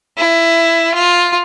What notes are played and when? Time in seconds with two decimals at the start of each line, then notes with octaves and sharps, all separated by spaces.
0.17 E4
0.94 F4